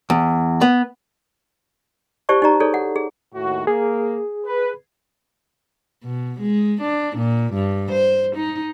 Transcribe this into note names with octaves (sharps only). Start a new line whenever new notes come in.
E2
B3
E4 G4 C5 D5 A5 C#6
D#4 G4 D5 A#5
D#4 G#4 A4 C#5 D5
F#5
G#4
D#2 A2 F#4
A#3 G#4
B4
B2
G#3
D4
A#2
G2
C5
D#4